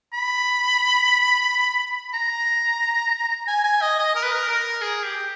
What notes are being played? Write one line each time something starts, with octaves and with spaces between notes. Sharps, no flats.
B5
A#5
G#5
G#5
D#5
D#5
A#4
B4
A#4
A#4
G#4
G4